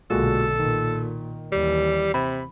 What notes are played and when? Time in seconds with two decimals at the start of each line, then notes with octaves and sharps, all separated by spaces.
0.10 B1 A#2 D3 G#3 F#4 A4
0.59 A#2 D#3
1.52 D#2 E3 G3
2.14 C3 B5